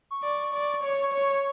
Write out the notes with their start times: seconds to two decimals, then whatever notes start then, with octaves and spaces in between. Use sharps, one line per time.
0.11 C#6
0.23 D5
0.54 D5
0.83 C#5
1.13 C#5